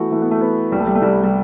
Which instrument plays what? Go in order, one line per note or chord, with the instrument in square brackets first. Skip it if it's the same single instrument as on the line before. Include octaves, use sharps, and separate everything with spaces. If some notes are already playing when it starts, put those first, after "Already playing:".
Already playing: [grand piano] E3 F#4 [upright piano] A3 B3
[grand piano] E3 [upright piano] A3
[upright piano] B3
A3
[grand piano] B3
[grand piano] C2 [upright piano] G3
[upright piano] A3
G3
A3
[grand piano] C2 [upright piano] G3
[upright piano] G3